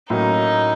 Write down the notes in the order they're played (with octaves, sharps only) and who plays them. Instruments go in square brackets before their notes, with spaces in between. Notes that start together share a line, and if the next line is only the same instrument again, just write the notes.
[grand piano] A2 F#3 A#3 C#4 F#4 [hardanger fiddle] D#4